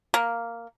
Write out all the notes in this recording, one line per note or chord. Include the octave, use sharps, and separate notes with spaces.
A#3